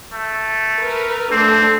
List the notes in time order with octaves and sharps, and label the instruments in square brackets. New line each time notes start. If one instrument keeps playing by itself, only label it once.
[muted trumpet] A3
[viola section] A#4 B4
[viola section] A3 D4 [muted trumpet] C4